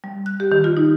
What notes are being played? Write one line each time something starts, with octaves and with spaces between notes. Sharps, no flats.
G3
F#6
G4
D#3
F4
D#4